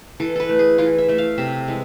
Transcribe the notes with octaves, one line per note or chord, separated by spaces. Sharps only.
E3 A4
A4 B4
A3
G#4
E3 F4
E5
A3 E5
F5
C3 E5
E3 G#3